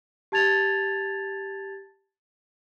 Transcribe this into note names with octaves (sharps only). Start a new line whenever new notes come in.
G4 A5 G#6 A6 F7